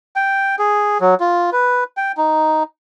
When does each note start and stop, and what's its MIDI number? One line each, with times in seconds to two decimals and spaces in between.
0.16 0.56 79
0.59 0.98 68
1.01 1.15 54
1.20 1.50 65
1.52 1.84 71
1.97 2.12 79
2.17 2.63 63